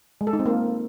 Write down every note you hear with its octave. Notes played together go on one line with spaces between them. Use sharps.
G#3
A4
D#4
C4
A#3